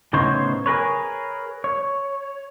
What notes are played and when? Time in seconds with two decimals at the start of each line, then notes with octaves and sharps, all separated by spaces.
0.13 A2 C#3 B3 D#4 C5 C#5
0.66 G#4 A#4 B4 C#5
1.64 C#5